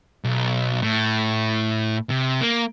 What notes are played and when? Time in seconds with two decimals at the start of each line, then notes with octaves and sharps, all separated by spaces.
0.24 B1
0.82 A2
2.10 C3
2.41 A#3